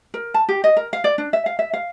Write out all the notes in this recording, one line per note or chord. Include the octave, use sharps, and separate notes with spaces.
A#4
A5
G4
D#5
A#4
F5
D5
D4
E5
F5
E5
F5